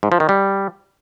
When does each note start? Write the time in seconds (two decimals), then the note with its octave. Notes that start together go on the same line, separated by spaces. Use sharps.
0.03 G#2
0.12 F3
0.20 D#3
0.29 G3